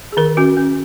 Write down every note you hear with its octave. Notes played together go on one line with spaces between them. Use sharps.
G#4
D#3 A#4
C#4 F#4
C#4